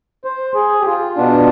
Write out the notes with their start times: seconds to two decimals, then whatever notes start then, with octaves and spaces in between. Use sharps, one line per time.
0.25 C5
0.55 G#4
0.81 G4
0.87 F4
1.17 B2 B3 D4